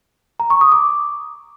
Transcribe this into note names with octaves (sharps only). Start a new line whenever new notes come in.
A#5
C#6
D#6
D6